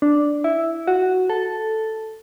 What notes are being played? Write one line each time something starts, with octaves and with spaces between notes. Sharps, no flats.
D4
E4
F#4
A4